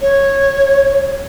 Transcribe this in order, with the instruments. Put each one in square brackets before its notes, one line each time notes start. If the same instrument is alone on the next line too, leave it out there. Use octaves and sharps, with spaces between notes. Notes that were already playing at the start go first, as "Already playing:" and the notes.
[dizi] C#5